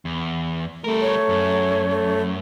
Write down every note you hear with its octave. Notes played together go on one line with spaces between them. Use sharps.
E2
G3 A3 A#4
C#5
F#2
A3